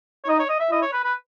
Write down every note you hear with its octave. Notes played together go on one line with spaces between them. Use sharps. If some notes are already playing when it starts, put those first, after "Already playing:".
C#5
D#4 D#5
C#5
D#5
E5
E4 D#5
C#5
B4
B4